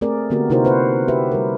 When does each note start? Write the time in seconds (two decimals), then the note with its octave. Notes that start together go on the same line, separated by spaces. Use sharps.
0.01 A3 C4 G#4 A#4 D5
0.30 D3 A#3 B3 F#4 G4 A#4
0.50 C3 D#4 E4 F#4 A#4 C5
0.65 B4 C5 F#5
1.08 F#4 G4 B4 E5
1.32 G3 A#4